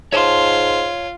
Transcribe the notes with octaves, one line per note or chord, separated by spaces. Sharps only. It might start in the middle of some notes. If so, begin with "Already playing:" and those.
G#2 F4 C#5 A5 C6